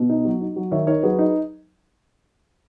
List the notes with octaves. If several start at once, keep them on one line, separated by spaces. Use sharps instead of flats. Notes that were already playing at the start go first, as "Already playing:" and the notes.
Already playing: B2
D#4
F#3
D#4
F#3
D#3 C#5 E5
D#4 A#4 C#5
F#3 G#4 B4
D#4